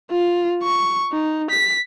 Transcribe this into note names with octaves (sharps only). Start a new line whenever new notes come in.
F4
C#6
D#4
B6